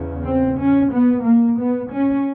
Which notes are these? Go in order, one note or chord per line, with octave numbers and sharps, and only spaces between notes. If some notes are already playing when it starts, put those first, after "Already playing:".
Already playing: E2 C#3
C4
C#4
B3
A#3
B3
C#4